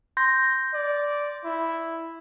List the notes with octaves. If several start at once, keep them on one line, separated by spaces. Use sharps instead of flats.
C6 G6 A#6
D5
E4